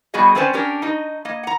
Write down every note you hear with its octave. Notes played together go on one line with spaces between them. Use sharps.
G3 B3 F#4 G#4 D#5
A3 C4 C#4 B4 C5 D5
C#4 D4 G4 A#4
D#4 D#5
A#3 D#5
F#5 A#5